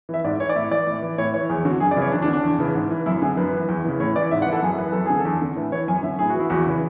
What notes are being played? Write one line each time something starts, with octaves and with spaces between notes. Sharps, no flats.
E3 E5
G#2 D5
E3 C#5
D5
A2 E5
E3 D5
A2
E3
A2 C#5
E3 C#5
E2 G#4
D3 F#4
F#2 G#4
D5
C#3 E3
C#5
E2 D4
D4
D3
D4
E2
C#3 E3
G#2
E3
F#2 E4
D3 G#4
F#2 B4
E3
E2
C#3 E3
A2 C#5
E3 D5
G#2 E5
F#5
E3
A4
F#2 G#4
E3 B4
F#2 A4
D3 G#4
A4
E2
D3
A2 B4
E3 C#5
F#2 G#5
D3 E5
A2 G#4
E3 F#4
E4
E2 F#4
C#3 E3